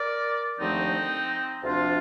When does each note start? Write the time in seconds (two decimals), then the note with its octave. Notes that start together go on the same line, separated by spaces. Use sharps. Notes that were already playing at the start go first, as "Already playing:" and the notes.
Already playing: A#4 D5
0.59 D#2 D3 F3 A3 C4 D#4
1.63 D2 C3 F3 D4 F4